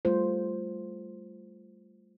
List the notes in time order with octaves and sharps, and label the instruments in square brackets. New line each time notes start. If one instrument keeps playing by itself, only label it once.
[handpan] G3 A3 F4 C5